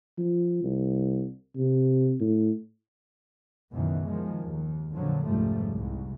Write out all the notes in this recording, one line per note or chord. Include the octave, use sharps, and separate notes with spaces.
F3
C2
C3
A2
C#2 F#2 B2 D#3 E3
D#3 F3 G#3
D#2
F2 A#2 D3 F3 F#3
F1 C#2 G#2 F3 G3 A3
C2 G#2